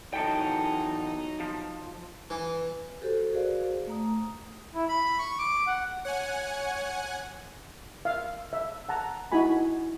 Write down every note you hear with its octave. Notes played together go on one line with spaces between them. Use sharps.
E2 F#3 D#4 A4 G5
F3
E3
F#4 G4 A4 C5
F#4 G#4 A#4 C5 D5 F5
A3 A#5 D#6
E4
B5
C#6
D6
F#5
C#5 F#5 G#5
E5 F5
E5
F#5 A5 A#5
D#4 E4 F#4 G#5 B5